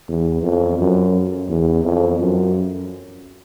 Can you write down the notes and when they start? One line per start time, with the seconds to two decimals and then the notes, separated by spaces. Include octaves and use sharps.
0.09 E2
0.43 F2
0.79 F#2
1.49 E2
1.84 F2
2.20 F#2